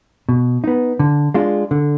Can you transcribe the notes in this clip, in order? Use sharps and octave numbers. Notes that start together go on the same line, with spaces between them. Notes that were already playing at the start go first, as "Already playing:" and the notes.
B2
B3 D#4
D3
G#3 D4 F4
D3